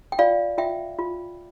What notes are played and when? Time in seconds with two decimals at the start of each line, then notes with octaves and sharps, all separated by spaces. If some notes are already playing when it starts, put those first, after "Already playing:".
0.12 G5
0.19 F4 D5 F5
0.58 F4 E5 G5
0.99 F4